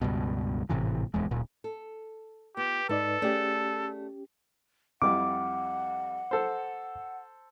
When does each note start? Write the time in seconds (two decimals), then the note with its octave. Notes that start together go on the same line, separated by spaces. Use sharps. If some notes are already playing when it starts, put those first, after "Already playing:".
0.02 C#2 G2 B2
0.69 G#1 A2 C3 E3
1.14 D1 E2 G#3
1.31 D1 A#2
1.64 A4
2.57 B3 F4 G4
2.89 G#2 D#4 A4 B4 D5
3.22 A3 C#4 G4 G#4 D5
5.02 F2 G3 E4 F#5 D6
6.31 A4 C5